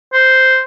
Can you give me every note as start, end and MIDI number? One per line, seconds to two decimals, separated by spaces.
0.13 0.61 72